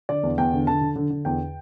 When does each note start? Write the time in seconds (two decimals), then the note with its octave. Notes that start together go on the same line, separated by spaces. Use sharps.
0.09 D3 D5
0.23 E2
0.38 E2 G5
0.53 D3
0.67 D3 A5
0.81 D3
0.96 D3
1.10 D3
1.25 E2 G5